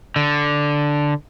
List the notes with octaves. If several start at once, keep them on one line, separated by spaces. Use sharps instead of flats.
D3